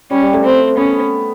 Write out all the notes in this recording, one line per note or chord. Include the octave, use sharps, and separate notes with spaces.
G3 C#4
G3
A3
C4
B3 C#4